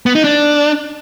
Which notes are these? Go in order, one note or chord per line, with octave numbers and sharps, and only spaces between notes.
B3
D#4
D4